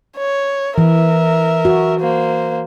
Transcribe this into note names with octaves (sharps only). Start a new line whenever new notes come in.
C#5
E3 A#4 E5
F#4
A#3 C5